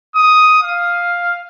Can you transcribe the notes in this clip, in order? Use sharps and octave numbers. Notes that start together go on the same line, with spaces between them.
D#6
F5